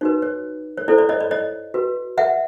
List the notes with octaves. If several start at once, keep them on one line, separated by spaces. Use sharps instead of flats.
D#4 F#4 B4 C#5
C#5
C#5
E4 A4 C5 D5
D5
C#5 D#5
D5
C#5 D#5
F#4 B4
E5 F#5